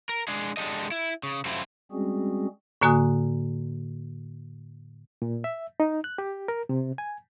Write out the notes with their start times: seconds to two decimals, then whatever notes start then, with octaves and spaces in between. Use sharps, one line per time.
0.09 A#4
0.28 G#3 D4 G#4
0.57 G#3 D4 G4 A4 D#5
0.92 E4
1.23 C#3
1.45 F#2 C3 A3 C4 E4 F4
1.92 G3 G#3 C4 C#4 F#4 G#4
2.81 A2 D3 A#3 F#4 G#5 D#6
5.22 A#2
5.44 E5
5.80 D#4
6.04 F#6
6.18 G4
6.48 A#4
6.69 C3
6.98 G#5